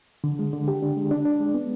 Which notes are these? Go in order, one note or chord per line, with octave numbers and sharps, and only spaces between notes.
D3
G#3
D3
G4
D4
G#3
D4
D4
G#3
B3